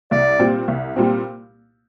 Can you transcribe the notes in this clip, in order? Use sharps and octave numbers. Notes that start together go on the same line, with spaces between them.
C2 D5
A#2 G3 C4
C2
A#2 G3 C4